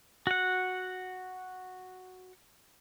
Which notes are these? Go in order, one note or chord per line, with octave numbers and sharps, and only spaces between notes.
F#4 F#5